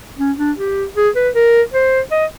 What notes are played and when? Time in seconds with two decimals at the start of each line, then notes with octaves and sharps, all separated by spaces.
0.18 C#4
0.38 D4
0.57 G4
0.95 G#4
1.16 B4
1.35 A#4
1.73 C5
2.11 D#5